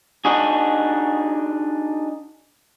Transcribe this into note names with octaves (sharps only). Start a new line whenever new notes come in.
D4 D#4 F#4 G#4